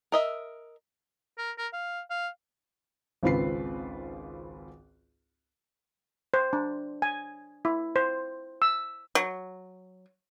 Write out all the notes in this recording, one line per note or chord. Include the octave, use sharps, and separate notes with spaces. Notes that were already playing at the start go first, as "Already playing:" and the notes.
A#4 D#5 E5
A#4
A#4
F5
F5
G#1 C#2 C4 F4 B4 C7
C5
D4
G#5
E4
C5
E6
F#3